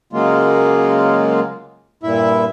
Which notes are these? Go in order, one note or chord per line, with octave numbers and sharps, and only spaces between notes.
C#3 F#3 G#3 A#3 F4
G2 A#2 E4 E5